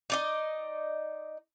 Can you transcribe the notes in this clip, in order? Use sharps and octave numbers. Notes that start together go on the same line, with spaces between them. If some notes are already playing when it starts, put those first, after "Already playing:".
D#4 D5 D#5